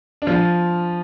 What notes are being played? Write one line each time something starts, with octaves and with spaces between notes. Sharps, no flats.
D4
F3 F4